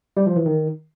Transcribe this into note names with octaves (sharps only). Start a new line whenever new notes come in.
G3
F3
E3
D#3